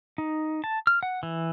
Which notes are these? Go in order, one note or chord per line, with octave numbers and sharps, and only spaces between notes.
D#4
A5
F6
F#5
E3